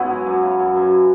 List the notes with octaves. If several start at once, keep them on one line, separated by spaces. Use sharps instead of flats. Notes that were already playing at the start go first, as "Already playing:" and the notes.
Already playing: G#2 B3 C#4 E4 F#4
F#3
F#2
C#3
F#2
F#2